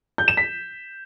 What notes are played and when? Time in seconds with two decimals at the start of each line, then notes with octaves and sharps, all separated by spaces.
0.18 G6
0.28 E7
0.37 B6